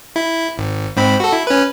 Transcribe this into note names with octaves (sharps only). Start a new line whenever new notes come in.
E4
G#1
G#2 C4 B5
F#4 A4
E4
C#4 B4